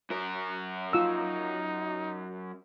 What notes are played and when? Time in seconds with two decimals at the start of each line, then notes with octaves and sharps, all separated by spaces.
0.10 F#2 A#4
0.93 D#4 F4 E6